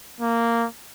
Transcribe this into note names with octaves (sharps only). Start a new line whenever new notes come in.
A#3